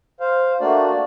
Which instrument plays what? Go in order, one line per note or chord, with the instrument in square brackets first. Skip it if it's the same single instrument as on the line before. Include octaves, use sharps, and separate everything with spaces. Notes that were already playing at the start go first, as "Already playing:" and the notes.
[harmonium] C5 F5
A3 A#3 D4 F#4 D5